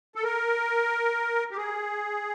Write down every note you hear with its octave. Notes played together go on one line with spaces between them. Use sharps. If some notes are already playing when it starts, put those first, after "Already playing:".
A4
A#4
G4
G#4